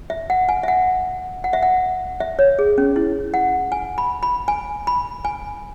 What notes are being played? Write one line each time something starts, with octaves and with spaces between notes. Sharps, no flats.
E5
F#5
G#5
E5
F#5
F#5
E5
F#5
E5
C#5
G#4
C#4
E4
F#5
G#5
B5
B5
G#5
B5
G#5